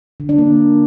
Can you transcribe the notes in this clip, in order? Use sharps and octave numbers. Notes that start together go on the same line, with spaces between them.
D3
D4
A#3